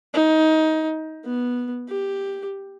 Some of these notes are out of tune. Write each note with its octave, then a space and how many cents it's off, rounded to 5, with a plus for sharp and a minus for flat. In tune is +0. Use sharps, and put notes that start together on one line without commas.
D#4 +20
B3 -10
G4 +5